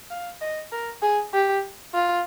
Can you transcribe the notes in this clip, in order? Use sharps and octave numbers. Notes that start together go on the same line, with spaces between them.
F5
D#5
A#4
G#4
G4
F4